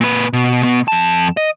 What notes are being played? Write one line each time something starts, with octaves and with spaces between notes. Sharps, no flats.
A#2 B4
B2
B2 B3
F2 A5
D#5